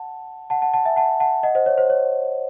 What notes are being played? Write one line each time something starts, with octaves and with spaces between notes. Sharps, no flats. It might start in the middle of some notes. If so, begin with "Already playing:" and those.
Already playing: F#5 A5
F#5 A5
F#5 A5
F#5 A5
E5 G#5
F#5 A5
F#5 A5
D#5 F#5
C5 D#5
C#5
C5
C#5